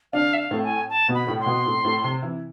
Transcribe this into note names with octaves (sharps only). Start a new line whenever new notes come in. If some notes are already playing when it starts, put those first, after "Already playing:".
D3 D4 F5
E5
F5
A2 A3
G#5
A5
B2 B3
B5
A2 A3
C6
B2 B3
A2 A3
A2 A3
C3 C4
E3 E4